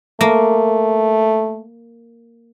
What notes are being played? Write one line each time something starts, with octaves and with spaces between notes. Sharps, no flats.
A3 A#3